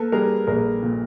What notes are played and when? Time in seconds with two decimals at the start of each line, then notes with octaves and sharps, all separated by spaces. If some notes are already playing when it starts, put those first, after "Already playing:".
Already playing: A#3 A4 B4
0.12 G3 G#4 A#4
0.47 A#1 G#4 A#4
0.83 A#2